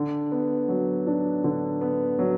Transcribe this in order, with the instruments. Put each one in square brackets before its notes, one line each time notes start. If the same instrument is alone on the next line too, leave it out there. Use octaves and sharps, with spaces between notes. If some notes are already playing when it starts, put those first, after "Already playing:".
Already playing: [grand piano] D3
B3
F#3
D4
D3
B3
F#3